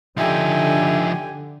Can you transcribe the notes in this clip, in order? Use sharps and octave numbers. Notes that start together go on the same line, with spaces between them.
D3 F3 D#4 G4 E5 G#5